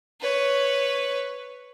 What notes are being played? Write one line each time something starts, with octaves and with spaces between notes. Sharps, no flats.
B4 C#5